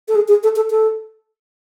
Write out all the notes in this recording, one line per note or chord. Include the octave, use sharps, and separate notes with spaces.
A4
G#4
G#4
A4
A4
A4